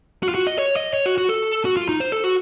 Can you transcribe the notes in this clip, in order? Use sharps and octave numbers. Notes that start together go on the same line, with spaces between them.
F#4
F4
F#4
D#5
C#5
D#5
C#5
F#4
F#4
A4
F#4
F4
D#4
C5
A4
F#4